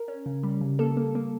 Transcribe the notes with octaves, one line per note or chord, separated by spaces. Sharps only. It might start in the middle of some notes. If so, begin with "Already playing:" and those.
Already playing: A#4
C#4
C#3
G3
C#3
A#3 A4
A#3
A#3